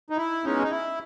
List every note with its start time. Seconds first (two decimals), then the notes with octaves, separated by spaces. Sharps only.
0.10 D#4
0.17 E4
0.44 B2 G#3 C#4 D#4
0.62 D#4
0.71 E4